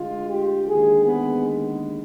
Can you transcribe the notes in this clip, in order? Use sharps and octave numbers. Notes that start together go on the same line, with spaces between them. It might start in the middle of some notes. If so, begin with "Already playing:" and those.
Already playing: D2 D3 G#3 F4
G4
D#2 D3 G#3 G#4
B3